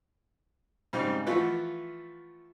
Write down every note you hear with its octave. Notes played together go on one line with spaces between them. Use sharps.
G#2 C#3 G3 C4 D#4
E3 F3 A3 F4 F#4 B4